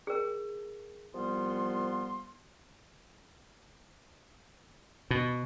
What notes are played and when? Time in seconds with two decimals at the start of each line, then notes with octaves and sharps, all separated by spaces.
0.07 G#4 A#4
1.13 C2 F3 G3 B3 C6
5.11 B2